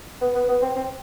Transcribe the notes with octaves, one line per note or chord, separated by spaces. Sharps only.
B3
B3
B3
C4
C4